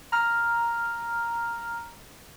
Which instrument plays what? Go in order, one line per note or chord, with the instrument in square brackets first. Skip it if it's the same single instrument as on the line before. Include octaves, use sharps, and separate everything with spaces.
[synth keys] A#5 F6